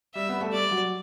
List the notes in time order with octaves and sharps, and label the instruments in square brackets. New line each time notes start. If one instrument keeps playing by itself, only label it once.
[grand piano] G3 [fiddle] E5
[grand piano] B3
A3
[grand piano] G3 [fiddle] D5
[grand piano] F#3